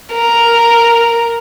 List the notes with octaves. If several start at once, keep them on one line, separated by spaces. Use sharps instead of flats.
A#4